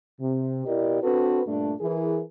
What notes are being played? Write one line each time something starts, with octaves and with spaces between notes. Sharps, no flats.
C3
B2 E4 G4 A#4 D5 D#5
C4 D4 F#4 A4 B4
G2 A#2 A3 D4
E3 G#4 A#4